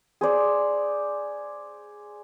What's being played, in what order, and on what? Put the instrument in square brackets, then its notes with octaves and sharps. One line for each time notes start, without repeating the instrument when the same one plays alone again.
[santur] G#4 C5 D5